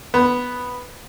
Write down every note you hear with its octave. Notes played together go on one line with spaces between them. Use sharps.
B3